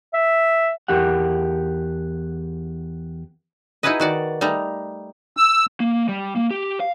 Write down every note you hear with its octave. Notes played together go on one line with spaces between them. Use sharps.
E5
E2 G4 A#4 F#5
D#4 E4 F#4 G#4 B4 D#5
D#3 F#4 D5
G3 A3 D#4 A#5
E6
A#3
G3
A#3
G4
F5